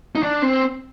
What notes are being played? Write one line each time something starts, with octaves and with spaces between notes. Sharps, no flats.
D#4
D4
C4